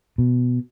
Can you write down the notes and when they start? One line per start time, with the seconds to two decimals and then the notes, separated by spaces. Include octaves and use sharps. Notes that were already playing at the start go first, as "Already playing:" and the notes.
0.18 B2